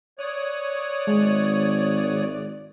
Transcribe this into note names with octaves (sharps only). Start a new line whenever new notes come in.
C#5 D5 D#6 F#6
G#1 G#3